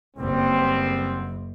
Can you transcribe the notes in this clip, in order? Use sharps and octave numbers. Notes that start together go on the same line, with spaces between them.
F#1 G3 B3 C4